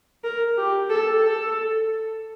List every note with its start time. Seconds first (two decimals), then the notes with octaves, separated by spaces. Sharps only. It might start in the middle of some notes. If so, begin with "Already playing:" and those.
0.24 A#4
0.57 G4
0.90 A4
1.22 A4